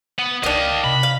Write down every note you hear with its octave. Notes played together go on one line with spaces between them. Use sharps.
B3
C#2 D#3 D4 D#4 D#5 F5
C3 B5
F5